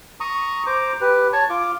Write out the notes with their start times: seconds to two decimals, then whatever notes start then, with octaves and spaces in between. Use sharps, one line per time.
0.20 A#5 C#6 D#6
0.67 C5 A#5 D6
1.01 G4 B4
1.33 C#5 A5 C#6
1.50 F4 D6